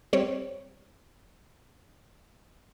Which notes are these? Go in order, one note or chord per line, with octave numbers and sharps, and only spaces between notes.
G3 C4 C#5